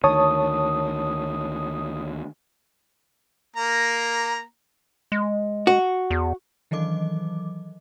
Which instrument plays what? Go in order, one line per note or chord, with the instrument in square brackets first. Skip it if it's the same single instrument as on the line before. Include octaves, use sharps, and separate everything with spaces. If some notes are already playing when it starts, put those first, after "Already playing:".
[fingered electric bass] D2 D#3 [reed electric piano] C#5 A5 [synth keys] D#6
[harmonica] A#3 A#5
[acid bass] G#3
[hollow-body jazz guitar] F#4
[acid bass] E2
[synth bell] D#3 E3 F#3 D#5 D6